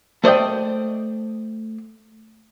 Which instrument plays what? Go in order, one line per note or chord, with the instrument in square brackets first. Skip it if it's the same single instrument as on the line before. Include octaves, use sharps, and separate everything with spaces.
[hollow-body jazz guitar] A3 C5 D5 D#5 G5